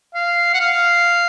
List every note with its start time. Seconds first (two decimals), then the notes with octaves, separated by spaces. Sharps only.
0.15 F5
0.54 F#5
0.61 F5